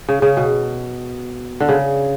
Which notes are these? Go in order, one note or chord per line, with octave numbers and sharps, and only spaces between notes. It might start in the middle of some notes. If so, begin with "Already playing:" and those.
C#3
C#3
B2
D3
C#3